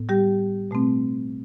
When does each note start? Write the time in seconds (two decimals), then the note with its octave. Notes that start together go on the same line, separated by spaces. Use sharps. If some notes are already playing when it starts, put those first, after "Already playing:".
Already playing: A2 B3
0.09 G3 G4
0.71 B2 A3 C4